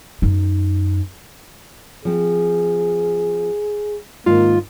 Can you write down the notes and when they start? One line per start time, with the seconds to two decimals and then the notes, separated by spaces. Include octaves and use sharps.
0.22 F#2 D#4
2.05 F3 C4 G#4
4.26 G#2 D#3 A#3 F4